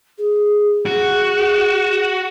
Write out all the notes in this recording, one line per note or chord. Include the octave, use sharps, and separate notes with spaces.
G#4
F#4